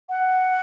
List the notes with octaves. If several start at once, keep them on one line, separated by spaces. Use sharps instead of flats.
F#5